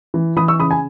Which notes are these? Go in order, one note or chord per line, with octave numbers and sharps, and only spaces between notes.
E3
E3 B5 D#6
C#6 E6
C#3 B5 D#6
G#5 B5